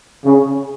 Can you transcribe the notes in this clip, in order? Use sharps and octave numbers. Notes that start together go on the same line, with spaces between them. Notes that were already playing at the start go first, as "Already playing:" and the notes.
C#3